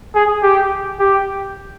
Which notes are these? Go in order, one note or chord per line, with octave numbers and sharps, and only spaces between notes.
G#4
G4
G4